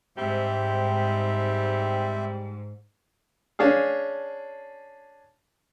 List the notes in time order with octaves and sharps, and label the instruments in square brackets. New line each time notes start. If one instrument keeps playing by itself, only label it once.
[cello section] G#2 [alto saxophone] G3 [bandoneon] C4 C5 E5
[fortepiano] C#4 D4 G#4 F5